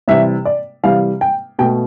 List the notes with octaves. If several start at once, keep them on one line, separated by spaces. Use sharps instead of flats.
C3 E3 G3 E5
D5
C3 E3 G3 F5
G5
B2 A3 G5